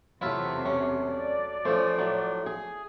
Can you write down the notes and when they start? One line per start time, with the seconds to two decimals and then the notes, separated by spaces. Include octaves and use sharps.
0.21 E2 C3 F#3 A3 E4 F4 E5
0.65 C#4
1.12 D5
1.65 F3 A3 C#4 C5
1.98 A2 F#3
2.46 G#4